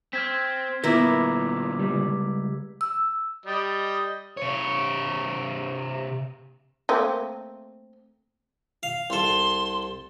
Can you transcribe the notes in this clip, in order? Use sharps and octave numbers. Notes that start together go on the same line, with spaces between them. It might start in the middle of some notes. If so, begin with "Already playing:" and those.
C4 F6 G#6 B6
D2 A#2 B3 E4 A#4 D6 E6 B6
C#2 G3
E6
G3 D#5
C3 C#5
A3 A#3 C4
F5
C2 A4 C6